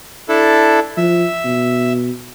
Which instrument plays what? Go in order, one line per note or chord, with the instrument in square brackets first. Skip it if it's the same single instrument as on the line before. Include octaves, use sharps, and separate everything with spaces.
[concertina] D4 E4 A4
[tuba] F3 [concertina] E5
[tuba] B2